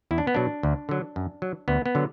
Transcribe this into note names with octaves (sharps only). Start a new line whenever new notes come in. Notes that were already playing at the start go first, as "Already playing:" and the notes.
E2 E4
D4
B3
B2 F#3 D4
D2
D3 F#3
F#2
F#3
D2 B3
B3
D3 F#3